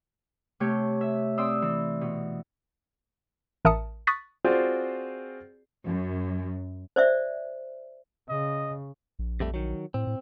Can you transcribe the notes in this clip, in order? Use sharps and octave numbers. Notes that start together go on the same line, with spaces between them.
C3 A3 G4 C#5 G6
E5
C4 D5 C6 D#6 E6
E3
B2
A1 A#4 E5 A5 D#6 C#7
C#6 D#6 F#6 A6 B6
C4 F4 F#4 G#4 C5 D5
F#2
C5 D5 E5
C#3 D#5
A#1
F2 G3 A3
D#3 F#3
A2 C4
A2